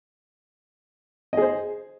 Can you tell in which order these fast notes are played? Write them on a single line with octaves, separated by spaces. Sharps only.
D#5 G#4 C5